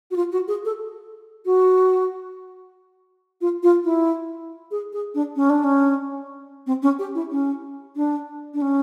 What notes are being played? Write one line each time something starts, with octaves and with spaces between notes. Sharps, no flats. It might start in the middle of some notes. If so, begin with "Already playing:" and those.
F#4
F4
F#4
G#4
A4
F#4
F4
F4
E4
G#4
G#4
D4
C#4
D4
C#4
C4
C#4
G4
E4
C#4
D4
D4
C#4